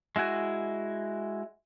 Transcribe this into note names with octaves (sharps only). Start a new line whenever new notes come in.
G#3 E4 F#4 G#5